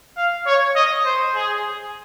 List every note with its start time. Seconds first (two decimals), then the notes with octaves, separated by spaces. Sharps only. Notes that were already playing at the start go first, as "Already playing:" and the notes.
0.17 F5
0.47 C#5
0.76 D#5
1.05 C5
1.35 G#4